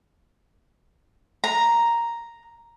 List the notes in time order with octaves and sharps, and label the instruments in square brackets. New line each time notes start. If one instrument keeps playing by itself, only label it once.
[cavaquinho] A#5